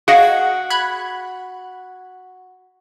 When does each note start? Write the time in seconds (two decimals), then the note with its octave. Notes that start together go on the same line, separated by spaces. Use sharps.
0.08 F#4 G#4 D#5 F5 F#5
0.70 B5 F#6 G#6